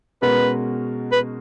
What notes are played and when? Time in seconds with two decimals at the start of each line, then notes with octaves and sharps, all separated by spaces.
0.22 B2 G#3 C#4 F#4 A#4 B4
1.12 B4